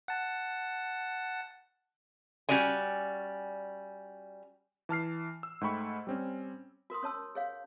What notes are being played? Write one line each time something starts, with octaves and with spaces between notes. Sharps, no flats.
F#5 A5
G3 C#4 F#4 D5 G#5
E3 A5 F6 C7
E6
G#2 A3 G5 B5 C#6
G3 C4 C#4
F#4 A#4 C6 D#6
C#4 C#5 A5 E6
G#4 C#5 F5